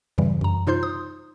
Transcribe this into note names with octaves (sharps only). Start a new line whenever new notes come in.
E2 G2 C#3 E3 G3
F#2 A#5
C3 D#4 F4 C5 C6 G6
D#6